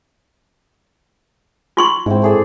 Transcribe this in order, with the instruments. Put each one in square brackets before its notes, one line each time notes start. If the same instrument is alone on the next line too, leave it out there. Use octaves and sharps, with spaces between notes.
[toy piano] F4 C6 C#6
[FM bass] G#2 [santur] C4 E4
[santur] A3 G#4 D5